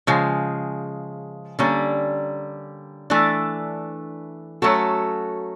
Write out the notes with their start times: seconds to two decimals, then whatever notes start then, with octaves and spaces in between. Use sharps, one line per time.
0.07 C#3 F3 G#3
1.59 D3 G3 A#3 C#4
3.10 E3 A3 D4
4.62 F#3 A3 C#4 F#4 A4